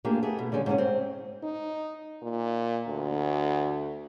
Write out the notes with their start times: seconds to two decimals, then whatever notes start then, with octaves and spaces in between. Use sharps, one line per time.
0.05 A3 A#3 D4 F4 G4 G#4
0.23 A3 B3 G#4
0.39 B2
0.52 D3 G3 G#3 C#4
0.66 G#2 C3 G#3 C#4
0.78 C4
1.43 D#4
2.23 A#2
2.87 D2